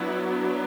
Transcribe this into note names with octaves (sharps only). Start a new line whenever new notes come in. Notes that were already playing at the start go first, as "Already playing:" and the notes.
Already playing: F#3 B3 D4 E4 F#4